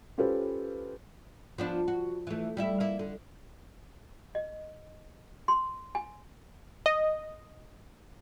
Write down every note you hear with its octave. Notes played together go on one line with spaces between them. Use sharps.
C#4 F4 G4 A4 B4 C5
F3 B3 D4
F#4
E3 A3
G3 E4 E5
A#3 E4
D3
D#5
C6
G#5
D#5